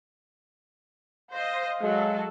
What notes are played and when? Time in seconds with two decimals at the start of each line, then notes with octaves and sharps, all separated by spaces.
1.31 C5 D#5 F5
1.81 F#3 G#3 A4